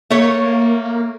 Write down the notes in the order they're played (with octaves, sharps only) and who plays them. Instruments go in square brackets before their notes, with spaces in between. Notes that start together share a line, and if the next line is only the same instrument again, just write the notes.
[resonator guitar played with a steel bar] A3 C#5 [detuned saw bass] A#3